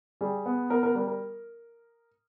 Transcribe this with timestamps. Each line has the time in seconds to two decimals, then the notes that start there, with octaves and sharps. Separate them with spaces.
0.21 G3 G#4
0.46 B3
0.70 B3 A#4
0.83 A#4
0.95 G3 A#4
1.07 A#4